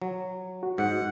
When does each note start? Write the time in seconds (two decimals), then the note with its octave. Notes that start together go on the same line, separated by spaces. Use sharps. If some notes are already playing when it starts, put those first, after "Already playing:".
0.02 F#3
0.63 F#4
0.78 G#2 F#5